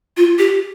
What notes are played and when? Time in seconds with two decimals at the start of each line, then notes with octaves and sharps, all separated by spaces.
0.17 F4
0.38 G4